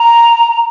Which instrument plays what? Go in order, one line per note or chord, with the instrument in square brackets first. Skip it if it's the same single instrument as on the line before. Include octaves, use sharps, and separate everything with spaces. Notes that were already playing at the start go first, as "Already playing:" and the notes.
Already playing: [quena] A#5